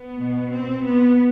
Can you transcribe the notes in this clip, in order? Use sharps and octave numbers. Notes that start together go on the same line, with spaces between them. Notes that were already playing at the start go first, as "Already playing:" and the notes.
Already playing: B3
B2
C4
B3